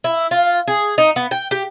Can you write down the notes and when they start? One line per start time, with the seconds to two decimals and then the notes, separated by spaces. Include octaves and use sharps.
0.04 E4
0.31 F4
0.68 G#4
0.98 D#4
1.16 B3
1.31 G5
1.51 G4